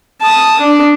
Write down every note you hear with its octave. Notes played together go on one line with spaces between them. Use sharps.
A5 D#6
D4